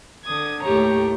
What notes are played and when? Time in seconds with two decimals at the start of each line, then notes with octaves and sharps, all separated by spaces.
0.25 D3 D#6 G#6
0.63 D#2 A2 A3 G4 C#5 A#5